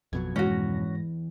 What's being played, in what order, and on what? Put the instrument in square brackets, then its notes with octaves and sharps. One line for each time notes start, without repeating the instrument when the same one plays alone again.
[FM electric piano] A1 G#6 [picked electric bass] F2 B2 F#3
[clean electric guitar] E2 E3 [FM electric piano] G#2 G#3 A#6 [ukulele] C#4 F#4